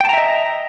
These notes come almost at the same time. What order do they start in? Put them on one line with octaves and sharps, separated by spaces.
G5 A5 A#5 E5 D#5